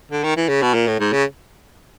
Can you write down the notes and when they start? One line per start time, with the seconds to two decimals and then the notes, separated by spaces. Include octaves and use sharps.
0.11 D3
0.23 D#3
0.37 E3
0.49 C#3
0.62 B2
0.74 A#2
0.87 A2
1.00 G#2
1.13 C#3